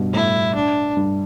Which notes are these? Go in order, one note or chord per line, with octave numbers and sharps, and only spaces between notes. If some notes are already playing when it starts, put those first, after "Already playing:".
Already playing: G2 B2
A2 E4
D4
G2